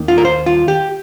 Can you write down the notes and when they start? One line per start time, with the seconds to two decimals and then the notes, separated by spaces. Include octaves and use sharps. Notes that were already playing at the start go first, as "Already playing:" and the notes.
Already playing: D#2 D#3 A#3 D#4
0.08 F4
0.18 A#4
0.25 C5
0.46 F4
0.68 G4